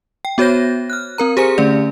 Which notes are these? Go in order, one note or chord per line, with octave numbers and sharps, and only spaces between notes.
G5
B3 F#4 C5 C#5 G6 A#6
F6 F#6
C4 A#4 A#5
G4 G#4 C5 G#5 A#5 C#7
D3 A3 C#4 D5